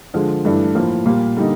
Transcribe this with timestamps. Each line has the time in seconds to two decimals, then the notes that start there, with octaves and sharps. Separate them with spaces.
0.14 D3 F3 G#3
0.45 G2 E3 A3 D4
0.75 A2 F3 A#3
1.05 A#2 G3 A#3
1.37 D3 G3 A#3 D#4